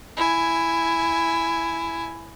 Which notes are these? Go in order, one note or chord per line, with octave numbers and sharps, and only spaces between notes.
E4 G#5